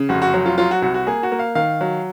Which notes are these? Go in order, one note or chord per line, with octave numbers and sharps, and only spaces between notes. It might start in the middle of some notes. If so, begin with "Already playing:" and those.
Already playing: C#3
F1 F#4
F#4
F#3
F4
F#3 F4
F#4
C2 F#4
F#4
A#3 G#4
F#4
A#3
F5
D#3 F5
F#3